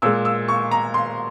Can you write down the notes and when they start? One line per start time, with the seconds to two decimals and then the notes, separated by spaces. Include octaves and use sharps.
0.02 A#2 G#3 E6
0.25 E6
0.48 C#6
0.71 A#5
0.94 C6